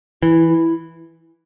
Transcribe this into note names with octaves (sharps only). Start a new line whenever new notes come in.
E3 E4
E4